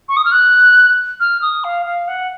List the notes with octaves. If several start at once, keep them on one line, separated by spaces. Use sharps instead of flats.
C#6
D#6
F6
F#6
F6
D#6
F5
F5
F#5